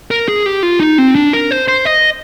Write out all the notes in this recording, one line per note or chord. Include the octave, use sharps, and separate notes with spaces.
A#4
G#4
G4
F4
D#4
C4
D4
A#4
C5
C5
D#5